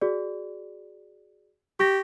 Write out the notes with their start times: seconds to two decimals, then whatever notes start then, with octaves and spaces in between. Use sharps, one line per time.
0.01 F#4 G#4 D5
1.80 G4 C#6 A#6